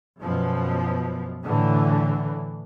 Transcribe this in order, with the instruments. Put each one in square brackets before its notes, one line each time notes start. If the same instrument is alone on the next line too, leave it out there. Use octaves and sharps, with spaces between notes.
[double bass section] F#2 B2 F3
A2 D3 E3